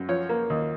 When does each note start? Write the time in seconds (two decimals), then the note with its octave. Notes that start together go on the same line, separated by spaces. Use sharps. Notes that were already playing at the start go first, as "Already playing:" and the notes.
Already playing: F#2
0.08 F3 C#5
0.29 A#3
0.50 D#2